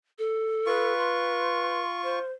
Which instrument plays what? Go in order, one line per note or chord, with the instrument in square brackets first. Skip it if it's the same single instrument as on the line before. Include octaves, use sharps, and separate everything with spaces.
[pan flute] A4
[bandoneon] F4 C#6 [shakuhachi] B4
[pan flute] C6
[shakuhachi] C5